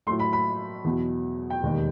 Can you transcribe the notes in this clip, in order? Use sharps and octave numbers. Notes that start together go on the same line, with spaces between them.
A2 F#3 A3 C6
B5
B5
E2 B2 F#3
G5
E1 D#2 D#3 G3 D#4